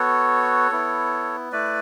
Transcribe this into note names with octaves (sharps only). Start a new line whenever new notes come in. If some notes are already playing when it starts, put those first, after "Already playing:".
Already playing: B3 F#4 A4 C#5
B3 E4
A3 E4 B4 D5